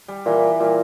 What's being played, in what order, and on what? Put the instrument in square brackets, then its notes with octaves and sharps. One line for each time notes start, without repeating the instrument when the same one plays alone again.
[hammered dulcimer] G3
[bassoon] A#2 [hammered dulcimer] E3
[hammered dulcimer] G3
[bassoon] A#2 [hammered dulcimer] G3